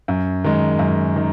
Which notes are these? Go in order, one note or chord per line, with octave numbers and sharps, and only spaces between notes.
F#2
D#3 G#3
F#2
D#3